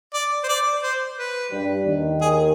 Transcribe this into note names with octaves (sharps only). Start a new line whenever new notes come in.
D5
C5
D5
C5
B4
G2 G3
D#2 D#3
G#4